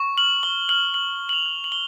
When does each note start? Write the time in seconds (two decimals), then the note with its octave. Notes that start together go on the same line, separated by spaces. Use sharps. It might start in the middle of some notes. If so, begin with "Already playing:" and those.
Already playing: C#6
0.17 F6 F#7
0.43 C#6 G7
0.69 F6 F#7
0.94 F6 F#7
1.20 F6
1.29 F#7
1.33 F7
1.46 F6
1.64 F#7
1.72 C#6 G7